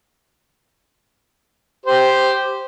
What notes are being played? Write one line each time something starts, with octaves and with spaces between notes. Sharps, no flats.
G4 C5